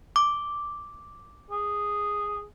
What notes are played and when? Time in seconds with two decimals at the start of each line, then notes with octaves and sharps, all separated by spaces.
0.16 D6
1.51 G#4